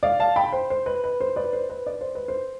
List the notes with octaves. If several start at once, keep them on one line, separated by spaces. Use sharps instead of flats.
D5 F5
F5 A5
G5 B5
C5
C5
B4
B4
C5
B4 D5
C5
B4
D5
C5
B4
C5